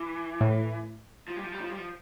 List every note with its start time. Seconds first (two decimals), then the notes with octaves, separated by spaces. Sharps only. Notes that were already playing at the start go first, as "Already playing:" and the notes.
Already playing: E3
0.41 A2
1.28 F3
1.36 G3
1.44 F3
1.52 G3
1.61 F3
1.70 G3
1.78 F3